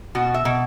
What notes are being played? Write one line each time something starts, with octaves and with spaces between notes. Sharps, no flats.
B2 F#4
E5
B2